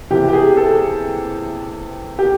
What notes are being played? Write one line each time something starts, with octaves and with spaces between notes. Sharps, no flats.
C3 E3 G4
G4
G#4
A4
G4